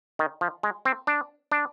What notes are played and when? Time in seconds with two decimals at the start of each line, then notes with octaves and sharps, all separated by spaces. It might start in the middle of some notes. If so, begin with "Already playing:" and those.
0.19 D#3
0.41 F3
0.63 G#3
0.85 C4
1.07 D4
1.52 D4